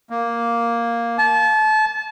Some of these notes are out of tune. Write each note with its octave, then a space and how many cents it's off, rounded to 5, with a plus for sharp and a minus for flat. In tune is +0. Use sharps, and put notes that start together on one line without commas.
A#3 +0
A5 -30